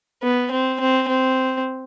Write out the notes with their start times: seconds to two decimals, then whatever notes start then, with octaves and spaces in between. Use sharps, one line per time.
0.23 B3
0.51 C4
0.80 C4
1.08 C4